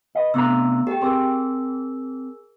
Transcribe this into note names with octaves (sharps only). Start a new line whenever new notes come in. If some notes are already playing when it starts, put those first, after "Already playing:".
B4 D#5
C3 A3 B3 D4 A#5 E6
G4 A4 G5
C4 G#4 A#4 E6